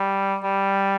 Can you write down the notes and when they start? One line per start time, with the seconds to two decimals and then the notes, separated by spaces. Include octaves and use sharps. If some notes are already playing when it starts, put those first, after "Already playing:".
Already playing: G3
0.43 G3